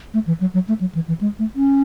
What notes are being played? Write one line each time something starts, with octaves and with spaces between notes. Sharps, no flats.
A3
E3
F#3
F#3
A3
F#3
E3
E3
G#3
A3
C#4